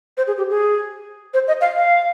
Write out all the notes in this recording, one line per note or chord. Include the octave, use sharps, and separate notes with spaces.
C5
G#4
G4
G#4
C5
D#5
F5
F5